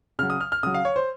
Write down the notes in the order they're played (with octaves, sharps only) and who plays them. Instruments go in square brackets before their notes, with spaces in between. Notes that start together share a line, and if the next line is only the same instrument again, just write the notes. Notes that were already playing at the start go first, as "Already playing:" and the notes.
[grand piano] C#3 F#3 F6
D#6
F6
F6
C#3 F#3 D#6
F5
C#5
C5